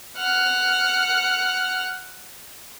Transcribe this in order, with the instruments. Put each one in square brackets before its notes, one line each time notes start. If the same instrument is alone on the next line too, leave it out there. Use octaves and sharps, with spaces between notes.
[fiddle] F#5 F6